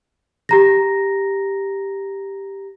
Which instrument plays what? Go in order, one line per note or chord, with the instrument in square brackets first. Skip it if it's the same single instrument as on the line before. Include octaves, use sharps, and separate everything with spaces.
[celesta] G4 A#5 A#6